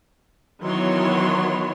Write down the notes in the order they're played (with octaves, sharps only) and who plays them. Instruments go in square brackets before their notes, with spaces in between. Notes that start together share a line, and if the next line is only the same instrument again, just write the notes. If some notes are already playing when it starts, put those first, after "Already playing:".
[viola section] D#3 E3 F#3 B3 C#5 C6